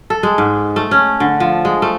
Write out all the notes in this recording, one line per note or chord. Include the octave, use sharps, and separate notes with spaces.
A4
G#3
G#2
A3
C#4
D3
F3
G#3
A3